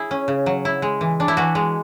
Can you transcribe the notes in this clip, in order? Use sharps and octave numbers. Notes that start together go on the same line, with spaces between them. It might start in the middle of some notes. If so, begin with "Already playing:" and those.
Already playing: E4 G#4
C#4
C#3
F#3
E4
G#3
E3
D4
E4
E3 F#4
G#3